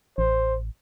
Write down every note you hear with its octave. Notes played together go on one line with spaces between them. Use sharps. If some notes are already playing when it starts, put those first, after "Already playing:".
A1 C5